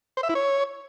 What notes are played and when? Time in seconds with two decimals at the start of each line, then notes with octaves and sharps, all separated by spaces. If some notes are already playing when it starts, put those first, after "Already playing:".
0.17 C5
0.23 E5
0.29 E4
0.35 C#5